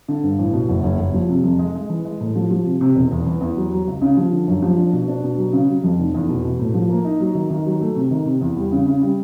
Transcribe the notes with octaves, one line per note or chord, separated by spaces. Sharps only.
D3
G2
A1
B2
F#1
F#1
F#1
F3
C3
F2
G#3
G#3
E3
G#3
A2
F3
F3
C3
C3
E1
E2
E3
E2
F#3
F#3
C#2
C#3
F3
D3
F#2
F3
D4
B2
D4
B2
F#3
C#3
F#3
F2
F1
E2
B2
B2
A2
F3
A#3
D#4
F#3
D#3
D#3
F#3
A3
C3
D#3
C3
E2
G3
C#3
C#3
G3